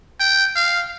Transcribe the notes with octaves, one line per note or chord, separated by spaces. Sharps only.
G5
F5